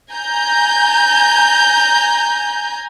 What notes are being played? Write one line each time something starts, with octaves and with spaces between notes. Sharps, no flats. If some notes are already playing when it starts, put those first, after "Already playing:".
G#5 A#5 G6